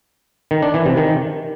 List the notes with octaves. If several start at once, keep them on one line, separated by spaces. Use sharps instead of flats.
D#3
D4
E3
C3
D#3